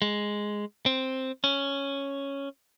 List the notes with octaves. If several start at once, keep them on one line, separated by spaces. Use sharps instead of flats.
G#3
C4
C#4